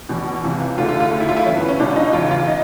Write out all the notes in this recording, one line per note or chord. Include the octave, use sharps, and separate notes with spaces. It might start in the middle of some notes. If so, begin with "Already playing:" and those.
E2 B2
C#2 C3 E3
D2 D3 F4
F4
F4
D2 D3
E4
F4
E4
G2 E3 C#4
B3
C#4
C#2 B2 D4
D#4
E2 C#3 E3 F4
F4
D#4